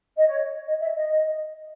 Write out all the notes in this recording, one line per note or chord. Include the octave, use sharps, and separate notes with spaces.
D#5
C#5
D#5
E5
D#5